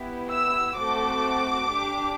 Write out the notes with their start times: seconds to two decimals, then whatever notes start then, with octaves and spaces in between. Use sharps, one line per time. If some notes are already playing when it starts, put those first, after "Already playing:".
Already playing: B3 E4 G4
0.29 E6
0.76 A3 C4 F#4 A4 D6
1.70 D4 G4